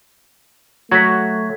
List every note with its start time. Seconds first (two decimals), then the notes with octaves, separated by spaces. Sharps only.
0.91 F#3 A3 F#4 G#6 B6